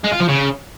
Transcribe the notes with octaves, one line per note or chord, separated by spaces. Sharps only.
G#3
F4
F3
C#3